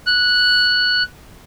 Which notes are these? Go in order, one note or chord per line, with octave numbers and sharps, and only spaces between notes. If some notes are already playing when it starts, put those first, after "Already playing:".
F#6